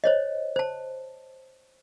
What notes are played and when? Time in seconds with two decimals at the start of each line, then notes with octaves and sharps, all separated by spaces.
0.04 C5 C#5 D#5
0.56 C5 A5